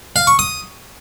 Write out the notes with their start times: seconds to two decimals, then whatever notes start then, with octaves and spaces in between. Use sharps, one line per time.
0.16 F5
0.27 C#6
0.39 D#6